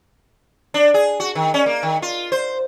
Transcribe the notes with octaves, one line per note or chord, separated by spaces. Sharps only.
D4
G#4
F#4
D#3
C#4
A#3
D#3
F4
C5